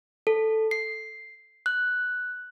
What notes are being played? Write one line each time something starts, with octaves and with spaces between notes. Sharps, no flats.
A4
C7
F#6